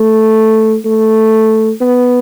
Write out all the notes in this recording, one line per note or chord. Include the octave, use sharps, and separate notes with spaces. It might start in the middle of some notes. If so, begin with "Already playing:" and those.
Already playing: A3
A3
B3